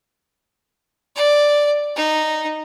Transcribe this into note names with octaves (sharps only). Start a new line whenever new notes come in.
D5
D#4